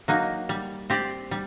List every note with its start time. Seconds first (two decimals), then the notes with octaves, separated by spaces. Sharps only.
0.08 F#3 A#3 D#4
0.49 G3
0.90 C4 G4 D5
1.31 G3